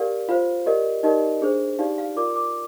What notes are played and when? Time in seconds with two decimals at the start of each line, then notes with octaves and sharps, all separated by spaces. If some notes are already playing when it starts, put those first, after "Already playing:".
Already playing: G4 A#4 D5 F5
0.29 F4 C5 F5
0.66 G4 A#4 D5 D#5
1.03 D#4 G4 A#4 D5 D#5
1.42 D4 G#4 C5
1.78 D#4 G4 D5 F5
1.98 F5
2.16 F4 A#4 D5 D6
2.36 D6